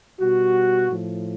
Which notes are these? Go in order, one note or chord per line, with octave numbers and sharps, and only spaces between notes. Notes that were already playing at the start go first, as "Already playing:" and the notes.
B2 G3 F#4
A2 F3